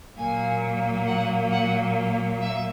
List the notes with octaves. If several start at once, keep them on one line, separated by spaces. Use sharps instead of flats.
A#2 F#3 A#3 G#5
F#5
F#5
E5